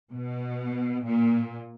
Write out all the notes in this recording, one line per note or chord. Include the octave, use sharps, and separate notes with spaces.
B2
A#2